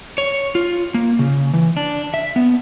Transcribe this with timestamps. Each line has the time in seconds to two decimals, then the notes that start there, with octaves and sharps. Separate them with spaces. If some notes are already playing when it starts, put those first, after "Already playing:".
0.18 C#5
0.55 F4
0.94 A#3
1.19 C#3
1.53 E3
1.77 D4
2.14 E5
2.36 B3